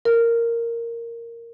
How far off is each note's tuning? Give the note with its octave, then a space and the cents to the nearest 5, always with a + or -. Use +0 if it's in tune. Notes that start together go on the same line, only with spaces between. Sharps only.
A#4 -5